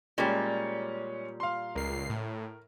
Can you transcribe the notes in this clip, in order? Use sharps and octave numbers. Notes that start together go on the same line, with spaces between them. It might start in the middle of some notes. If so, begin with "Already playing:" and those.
A#2 G3 G#3 C#4
F5 C6
C#2 A#4 C7
A2